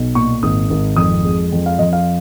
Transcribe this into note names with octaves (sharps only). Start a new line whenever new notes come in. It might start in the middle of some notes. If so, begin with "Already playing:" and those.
Already playing: B1
A#2 C#6
G#1 D#6
G#1
F2 D#6
G#3
F2
F5
F2 D#5
F5